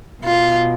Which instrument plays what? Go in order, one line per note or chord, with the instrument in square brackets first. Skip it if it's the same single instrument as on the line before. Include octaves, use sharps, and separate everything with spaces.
[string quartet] B2 F4